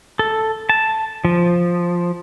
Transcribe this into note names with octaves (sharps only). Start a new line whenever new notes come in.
A4
A5
F3